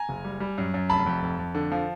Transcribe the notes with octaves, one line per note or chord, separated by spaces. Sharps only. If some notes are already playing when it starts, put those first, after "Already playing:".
Already playing: G#5 A#5
F#1
G3
G3
F#2
F#2
F1 A5 B5
F2
F2
F2
D3
F3